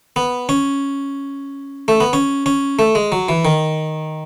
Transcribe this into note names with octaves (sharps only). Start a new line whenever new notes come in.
B3
C#4
A3
B3
C#4
C#4
A3
G#3
F#3
E3
D#3